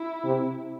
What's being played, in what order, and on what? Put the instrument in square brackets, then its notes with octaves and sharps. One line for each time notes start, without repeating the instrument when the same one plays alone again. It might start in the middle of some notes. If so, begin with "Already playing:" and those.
Already playing: [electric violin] E4
[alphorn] C3